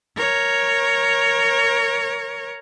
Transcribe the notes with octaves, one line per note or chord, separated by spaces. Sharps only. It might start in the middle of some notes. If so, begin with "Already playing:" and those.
A#4 C#5